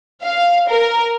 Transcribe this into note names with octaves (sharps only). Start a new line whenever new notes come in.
F5
A#4